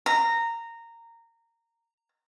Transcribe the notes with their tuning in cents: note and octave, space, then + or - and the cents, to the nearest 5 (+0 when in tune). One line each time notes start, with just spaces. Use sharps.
A#5 -15